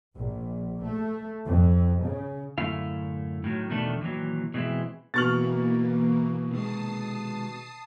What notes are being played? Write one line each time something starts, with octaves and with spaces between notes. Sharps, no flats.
A#1
A3
F2
C#3
F#2 A2 D3 A3 E4 F5
A2 D#3 F#3
E2 B2 D#3 A3 D4
A#2 D#3 E3 F#3
B2 E3 G#3 C4 E4
B2 E3 A#3 C#6 F6 A6 F#7
C3 D#3 G#3 A5 D#6 C7